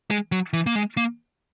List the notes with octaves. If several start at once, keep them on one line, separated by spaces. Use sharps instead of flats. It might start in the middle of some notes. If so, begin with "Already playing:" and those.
G#3
F#3
E3
A#3
G#3
A#3